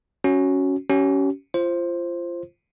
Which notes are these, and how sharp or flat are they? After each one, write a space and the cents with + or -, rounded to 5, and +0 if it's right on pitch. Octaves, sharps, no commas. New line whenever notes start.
C#4 +0 F#4 +0
C#4 +10 G4 -45
F4 -25 C5 +5